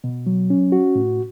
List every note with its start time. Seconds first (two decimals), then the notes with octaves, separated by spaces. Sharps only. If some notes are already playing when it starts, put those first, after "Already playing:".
0.04 B2
0.26 F#3
0.50 C#4
0.72 F#4
0.95 A2